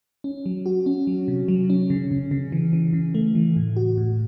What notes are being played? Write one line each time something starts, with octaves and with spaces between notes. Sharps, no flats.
C#4
F#3
F#4
C#4
F#3
C3
F#3
C#4
C#3
C#3
C#3
E3
E3
C#3
A3
E3
A2
F#4
A2